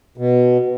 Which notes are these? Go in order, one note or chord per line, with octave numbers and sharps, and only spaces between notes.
B2